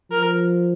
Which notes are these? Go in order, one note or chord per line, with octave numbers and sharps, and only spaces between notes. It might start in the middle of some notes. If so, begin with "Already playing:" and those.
F3 A#4